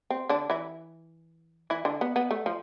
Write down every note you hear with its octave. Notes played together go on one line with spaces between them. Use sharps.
C4
D3 D4
E3 E4
E3 E4
D3 D4
B3
B3
A3
F3